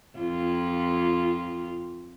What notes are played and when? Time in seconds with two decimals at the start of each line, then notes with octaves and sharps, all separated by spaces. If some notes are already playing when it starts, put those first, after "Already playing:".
0.18 F2 F4